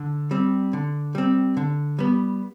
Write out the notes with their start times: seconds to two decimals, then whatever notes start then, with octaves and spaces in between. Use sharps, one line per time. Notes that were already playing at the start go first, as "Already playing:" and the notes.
Already playing: D3
0.31 G3 C4
0.73 D3
1.15 G3 C4
1.57 D3
1.99 G3 B3